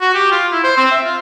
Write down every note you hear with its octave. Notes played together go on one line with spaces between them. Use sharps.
F#4
G4
F4
E4
C5
C4
E5
F4